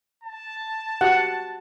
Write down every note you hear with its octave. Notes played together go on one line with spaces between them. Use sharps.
A5
F#4 G4 F#5